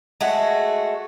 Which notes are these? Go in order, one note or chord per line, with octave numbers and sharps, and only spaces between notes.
G#3 A3 F#4